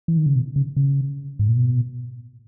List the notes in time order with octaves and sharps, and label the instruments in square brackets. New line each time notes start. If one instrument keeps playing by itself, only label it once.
[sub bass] E3
D#3
C#3
B2
C#3
C#3
G#2
A#2
B2